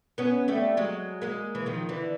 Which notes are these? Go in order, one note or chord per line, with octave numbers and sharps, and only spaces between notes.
B3 C#4
G3 A3
F#3 G#3
G#3 A#3
E3
D#3 F3
D3 E3